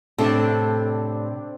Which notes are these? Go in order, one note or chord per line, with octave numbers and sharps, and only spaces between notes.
A2 C3 C4 D4 A4